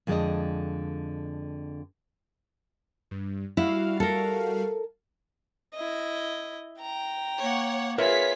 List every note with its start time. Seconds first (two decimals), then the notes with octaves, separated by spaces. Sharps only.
0.07 F2 D3 G#3 C#4 D5 D#5
3.11 G2
3.57 G3 E4 F#4 F5
4.00 A4 A#4
5.74 E4 D#5
6.80 G5 A#5
7.40 A#3 C#5 F#5
7.98 B3 F4 G#4 A#4 B4 C#5 E5 B6